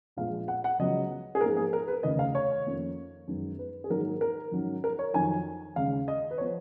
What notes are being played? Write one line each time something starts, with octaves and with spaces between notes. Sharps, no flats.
A#1 A#2 G#3 B3 F5
F#5
F#5
C#2 C#3 F#3 B3 D#5
G#4
G#2 F3 A#3 A#4
G#4
A#4
B4
F1 D#2 C#3 D#5
F5
C#5
F2 D#3 A#3 C#4
F#2 D#3 G#3 B3
B4
G#4
G#2 D#3 F#3 A#3 A#4
A#4
G#1 G#2 F#3 C#4
A#4
C#5
F2 D#3 F#3 G#5
D#2 C#3 G#3 C#4 F5
D#5
B4
F3 B3 C#5